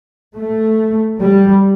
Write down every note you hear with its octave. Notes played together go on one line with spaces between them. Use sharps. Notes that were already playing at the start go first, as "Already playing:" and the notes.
A3
G3